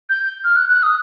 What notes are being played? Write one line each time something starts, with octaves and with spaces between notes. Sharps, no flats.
G6
F6
F#6
F#6
D#6